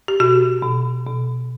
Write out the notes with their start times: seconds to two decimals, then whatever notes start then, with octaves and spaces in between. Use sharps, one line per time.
0.08 G4
0.20 B2 F#4
0.63 B2
1.07 B2